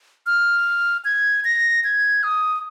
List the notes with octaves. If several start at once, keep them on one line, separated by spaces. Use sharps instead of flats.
F6
G#6
A#6
G#6
D#6